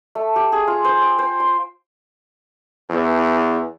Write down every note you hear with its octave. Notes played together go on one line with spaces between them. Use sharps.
A3
G4
G#4
F4
C5
G5
C5
C6
E2